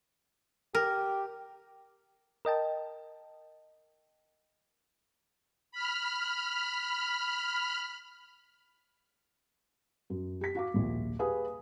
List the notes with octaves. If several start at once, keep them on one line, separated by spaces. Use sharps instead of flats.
G4 A#4
A#4 D#5 G5 A5
B5 F6
F#2
G4 B6
F#4 F5 D6
A#1 D#2
G4 G#4 B4 F5 G#5 D#6